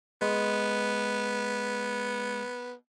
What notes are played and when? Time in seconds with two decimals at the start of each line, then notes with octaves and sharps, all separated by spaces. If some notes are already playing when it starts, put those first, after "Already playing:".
0.22 G#3 B3